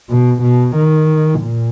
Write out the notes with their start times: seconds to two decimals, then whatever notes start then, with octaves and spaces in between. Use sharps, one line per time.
0.10 B2
0.42 B2
0.76 D#3
1.42 A#2